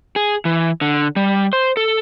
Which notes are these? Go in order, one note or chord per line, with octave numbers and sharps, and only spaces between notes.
G#4
E3
D3
G3
C5
A4